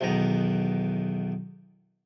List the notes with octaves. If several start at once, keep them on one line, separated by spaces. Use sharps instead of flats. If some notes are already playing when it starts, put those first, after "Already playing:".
B1 E2 D#3 B3 A#5